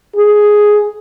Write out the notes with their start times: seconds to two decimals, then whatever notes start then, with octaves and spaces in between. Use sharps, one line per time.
0.16 G#4